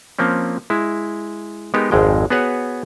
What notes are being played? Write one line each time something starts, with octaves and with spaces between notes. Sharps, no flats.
F3 A#3 C4 C#4
G#3 E4
G#3 B3 D#4 G4 A#4
G#1 F2 G#3 G5
B3 F#4 G#4 B4 C#5 F#5